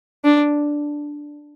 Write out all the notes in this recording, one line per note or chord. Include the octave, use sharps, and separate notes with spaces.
D4